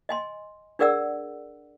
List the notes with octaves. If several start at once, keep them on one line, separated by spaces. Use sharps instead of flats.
D#5 G#5 C6
D4 G#4 A#4 D5 F#5 E6